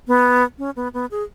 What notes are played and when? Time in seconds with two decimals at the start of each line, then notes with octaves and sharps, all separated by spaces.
0.08 B3
0.58 C#4
0.76 B3
0.94 B3
1.11 G#4